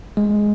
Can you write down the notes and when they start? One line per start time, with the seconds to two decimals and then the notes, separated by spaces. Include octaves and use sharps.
0.17 G#3